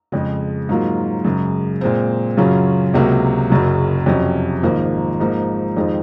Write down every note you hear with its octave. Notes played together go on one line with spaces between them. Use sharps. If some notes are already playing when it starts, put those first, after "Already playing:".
F2 C#3 G#3
G#2 F#3 A#3 F4
F#2 C#3 G#3
A#2 G#3 C4
F#2 C#3 F#3 C#4 F4
C#2 C3 F#3 A#3
F#1 F#2 C#3 F#3
F2 C3 F#3 C#4
G#1 G#2 F3 A#3
G#2 F3 A#3 D#4
F2 D#3 G#3 C4 F4